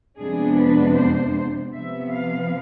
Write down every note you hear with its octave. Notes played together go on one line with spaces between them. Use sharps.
F2 C3 G#3 B3 D4 G#4
B4
C5
C3 F3 B3 E5
F5